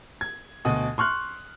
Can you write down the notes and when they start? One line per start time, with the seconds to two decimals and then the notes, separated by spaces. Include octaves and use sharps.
0.21 G#6
0.65 D2 B2 D#5 F#5 D#6
0.98 C6 C#6 F6 F#6